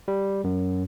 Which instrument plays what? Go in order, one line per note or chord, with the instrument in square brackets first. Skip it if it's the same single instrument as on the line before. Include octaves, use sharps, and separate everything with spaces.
[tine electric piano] G3
F#2